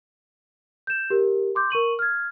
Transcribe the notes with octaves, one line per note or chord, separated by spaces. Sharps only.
G6 E7
G4 A#4
C6 D6 G6
A#4 C#6 D#7 F#7
F6 G#6